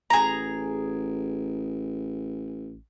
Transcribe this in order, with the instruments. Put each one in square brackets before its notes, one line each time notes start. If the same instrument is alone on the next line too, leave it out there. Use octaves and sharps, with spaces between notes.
[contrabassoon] A1 [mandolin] G#4 A#5